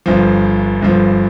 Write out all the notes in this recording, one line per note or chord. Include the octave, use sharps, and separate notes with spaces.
G1 G2 F3
G1 G2 F3